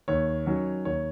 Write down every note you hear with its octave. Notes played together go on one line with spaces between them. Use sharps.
D#2 C#5
D#3 F#3 C#4
D#2 C#5